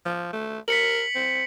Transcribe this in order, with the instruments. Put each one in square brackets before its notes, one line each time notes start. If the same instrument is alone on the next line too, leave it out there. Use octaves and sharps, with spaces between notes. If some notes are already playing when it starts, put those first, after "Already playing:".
[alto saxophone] F3
A3
[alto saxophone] A#4 [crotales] B6 C#7 F#7
[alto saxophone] C4